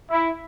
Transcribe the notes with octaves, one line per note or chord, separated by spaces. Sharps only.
E4